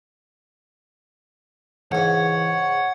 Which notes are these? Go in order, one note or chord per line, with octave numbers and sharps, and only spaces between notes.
C#2 G#2 E3 C#5 F#5